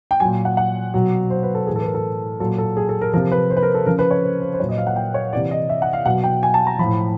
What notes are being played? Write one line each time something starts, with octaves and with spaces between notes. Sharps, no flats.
G5
A#2 F#3 G#5
F#5
F#5
B2 F#3
C5
B4
A4
A2 E3 G#4
A4
B4
A#4
A4
A#2 F#3 A4
A4
G#4
A4
A#4
C3 F3 A#4
B4
C5
B4
A#4
A4
C#3 F3 A#4
B4
C#5
C5
C5
C5
A#2 F#3 C#5
D#5
F5
F#5
G5
C#5
C3 E3 D5
D#5
E5
F#5
F5
B2 F#3 F#5
G5
G#5
A5
A#5
A2 F3 B5